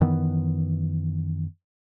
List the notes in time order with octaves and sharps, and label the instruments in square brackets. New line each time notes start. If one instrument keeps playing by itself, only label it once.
[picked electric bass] F#2 D#3 E3 B3